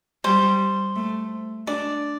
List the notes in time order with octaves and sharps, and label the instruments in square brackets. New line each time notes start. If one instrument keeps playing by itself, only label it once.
[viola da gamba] G3 [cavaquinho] C5
[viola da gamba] A3
[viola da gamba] D4 [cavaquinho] D5